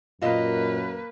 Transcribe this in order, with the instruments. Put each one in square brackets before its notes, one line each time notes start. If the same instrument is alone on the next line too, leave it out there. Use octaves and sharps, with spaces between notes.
[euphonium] F#2 [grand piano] A#2 [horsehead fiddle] A#3 B4 [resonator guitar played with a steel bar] C5 D#5 F5